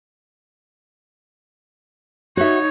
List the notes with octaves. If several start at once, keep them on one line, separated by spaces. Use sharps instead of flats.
D#4 F#4 C#5 E5